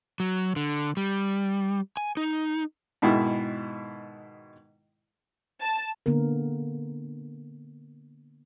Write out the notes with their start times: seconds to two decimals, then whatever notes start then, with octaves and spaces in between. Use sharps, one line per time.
0.20 F#3
0.56 D3
0.97 G3
1.97 G#5
2.17 D#4
3.02 G#2 B2 D#3 E4
5.60 A5
6.06 D3 A#3 B3 A#4